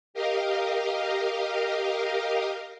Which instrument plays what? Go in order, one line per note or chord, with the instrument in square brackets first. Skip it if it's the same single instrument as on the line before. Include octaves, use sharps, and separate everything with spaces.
[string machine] G4 A#4 D#5 F5